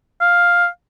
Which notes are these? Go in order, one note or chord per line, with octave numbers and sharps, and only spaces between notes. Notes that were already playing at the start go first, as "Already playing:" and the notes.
F5